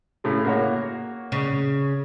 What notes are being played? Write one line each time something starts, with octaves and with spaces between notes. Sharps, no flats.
A2 C#3 A3
A#3 F#4 C#5
C#3